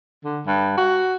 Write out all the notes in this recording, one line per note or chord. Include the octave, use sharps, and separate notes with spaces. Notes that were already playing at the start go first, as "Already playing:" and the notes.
D3
G2
F#4